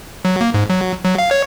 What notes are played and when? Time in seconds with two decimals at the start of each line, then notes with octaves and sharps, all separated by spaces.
0.25 F#3
0.41 A#3
0.54 G#2
0.70 F#3
1.04 F#3
1.18 F5
1.31 C#5